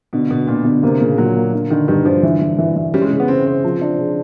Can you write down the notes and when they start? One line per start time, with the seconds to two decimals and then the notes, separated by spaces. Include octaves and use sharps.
0.13 B2 D3
0.30 B2 B3
0.47 A#2 D3
0.65 B2 D3
0.83 C3 A#3
1.00 A#2 C#3
1.18 A#2 F#3
1.36 A#3
1.54 D3
1.70 D3 D#3
1.88 G2 D#3
2.05 D3 F3
2.23 E3
2.41 E3
2.58 E3
2.76 E3
2.94 G3 C#4
3.02 G#3
3.11 C#3
3.20 B3
3.28 C4 C#4
3.46 C#3 C4
3.64 F3
3.81 D4
3.98 C#3